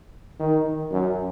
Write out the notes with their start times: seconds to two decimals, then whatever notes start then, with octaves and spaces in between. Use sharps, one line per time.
0.40 D#3
0.92 F#2